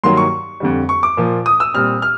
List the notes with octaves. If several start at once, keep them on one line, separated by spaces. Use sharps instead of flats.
G2 D#3 F#3 A#3 C6
C#6
F2 D3 G3
C#6
D6
A#2 F3 A#3
D#6
E6
A#2 G3 C4 F6
F6